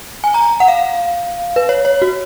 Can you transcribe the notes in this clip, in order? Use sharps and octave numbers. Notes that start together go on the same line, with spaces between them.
G#5
A#5
F#5
F5
B4
C#5
C#5
F#4